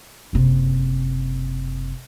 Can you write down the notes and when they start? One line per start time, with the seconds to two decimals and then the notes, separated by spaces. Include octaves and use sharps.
0.33 F#1 C3